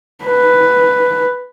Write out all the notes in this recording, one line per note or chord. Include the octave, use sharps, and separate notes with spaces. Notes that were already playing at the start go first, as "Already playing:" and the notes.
B4